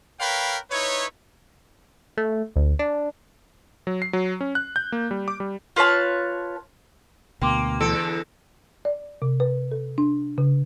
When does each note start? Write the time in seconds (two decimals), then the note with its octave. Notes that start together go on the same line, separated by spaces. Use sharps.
0.19 A#4 B4 C#5 F5 G5 B5
0.71 D#4 E4 B4 C#5
2.17 A3
2.56 D2
2.79 D4
3.87 F#3
4.02 C7
4.13 F#3
4.41 C#4
4.55 F#6
4.76 G6
4.92 A#3
5.11 G3
5.28 D6
5.40 G3
5.76 F4 B4 C#5 A5
7.42 D2 B2 A#3 G5 C6 D6
7.81 E2 D3 A4 E6 C#7 D7
8.85 D5
9.22 C3
9.40 B4
9.72 A4
9.98 D4
10.38 C#3